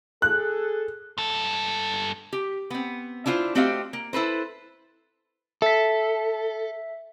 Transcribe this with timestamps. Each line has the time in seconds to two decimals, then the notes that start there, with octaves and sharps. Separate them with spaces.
0.22 G#4 A4 F#6
1.18 G2 A4
2.33 G4
2.70 B3 C4
3.26 D4 E4 F4 B4 C5
3.55 A3 C4 F#4 G4 D#5 F5
3.93 A#3
4.13 E4 A4 B4 C5
5.62 A4 E5 B6